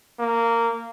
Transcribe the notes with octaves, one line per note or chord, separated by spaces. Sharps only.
A#3